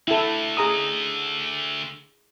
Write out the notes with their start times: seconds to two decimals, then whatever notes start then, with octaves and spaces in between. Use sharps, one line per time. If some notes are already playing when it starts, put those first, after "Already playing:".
0.08 D3 A3 E4 A4
0.57 G#4 A#5 D#6